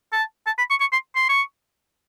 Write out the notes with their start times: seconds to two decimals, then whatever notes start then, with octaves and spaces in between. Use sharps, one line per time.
0.13 A5
0.47 A5
0.58 B5
0.70 C#6
0.81 C#6
0.93 C6
1.16 C6
1.29 C#6